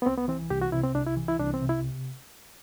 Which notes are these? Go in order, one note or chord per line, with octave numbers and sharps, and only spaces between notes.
B3
C2 C4
B3
E3 C4
C2 G4
F#4
C3 E4
C4
C2 D4
E4
E3
E4
C2 D4
C4
C3
E4